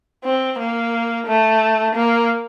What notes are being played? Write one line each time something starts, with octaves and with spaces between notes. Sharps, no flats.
C4
A#3
A3
A#3